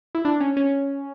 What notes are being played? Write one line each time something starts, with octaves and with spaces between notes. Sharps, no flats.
E4
D4
C#4
C#4